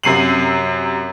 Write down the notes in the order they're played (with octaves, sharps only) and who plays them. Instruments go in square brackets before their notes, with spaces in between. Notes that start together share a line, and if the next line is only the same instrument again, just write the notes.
[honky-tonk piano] F#2 C3 C7 D#7 F#7